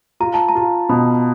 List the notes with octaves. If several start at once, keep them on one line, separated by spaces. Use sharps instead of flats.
F4 A#5
A5
A#5
F4
B2 B5